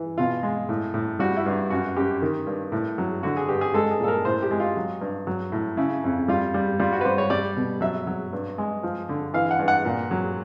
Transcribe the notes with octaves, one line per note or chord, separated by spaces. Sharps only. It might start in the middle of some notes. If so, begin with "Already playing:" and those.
Already playing: E3
B2 F4
G#3
A2
A2
G3 F#4
E4
G2
F#2 F#4
F#2 G4
D#3
G2
A2
F#3
D3 F#4
G#4
G2 G4
G#4
G#3 A4
G#4
A#2 A4
A#4
A2 C5
G4
G#3
F4
F#3
G2
F#3
A2
C#3 E4
F2
G3 F4
G3
G3 F4
F#4
B4
G3 C5
C#5
G3 D5
B2
F#3 E5
F#3
G2
G#3
F3
D3
E3 F5
F#5
G2
F#5
A#2
F#3